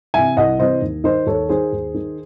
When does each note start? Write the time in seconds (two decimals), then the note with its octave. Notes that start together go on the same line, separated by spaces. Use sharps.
0.14 C3 E3 E5 G#5
0.37 C2 D#5 F#5
0.59 C3 E3 C5 D#5
0.82 D#2
1.04 D#3 C5 D#5
1.26 D#2 A4 C#5
1.49 D#3 G#4 C5
1.72 D#2
1.94 D#3